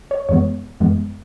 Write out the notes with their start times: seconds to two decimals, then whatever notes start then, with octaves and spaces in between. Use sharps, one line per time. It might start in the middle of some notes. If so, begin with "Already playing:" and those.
0.11 C#5
0.29 F#2 E3 G#3 B3 C#5
0.80 F#2 E3 G#3 B3